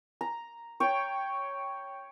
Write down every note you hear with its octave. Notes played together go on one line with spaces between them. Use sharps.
A#5
C#5 G5